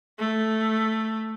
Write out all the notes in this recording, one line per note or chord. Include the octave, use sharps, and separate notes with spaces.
A3